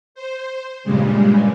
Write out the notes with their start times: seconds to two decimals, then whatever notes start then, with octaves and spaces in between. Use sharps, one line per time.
0.15 C5
0.84 G2 A#2 C#3 G3 G#3